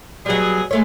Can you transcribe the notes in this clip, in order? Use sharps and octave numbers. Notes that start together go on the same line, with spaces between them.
B2 F#3 G3 G#4
G#3 A3 C#5